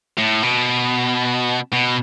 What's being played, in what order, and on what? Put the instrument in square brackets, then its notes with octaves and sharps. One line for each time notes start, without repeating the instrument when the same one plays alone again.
[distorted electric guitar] A2
B2
B2